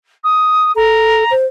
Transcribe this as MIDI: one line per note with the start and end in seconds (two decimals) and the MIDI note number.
0.23 0.71 87
0.76 1.24 69
0.76 1.32 82
1.31 1.46 72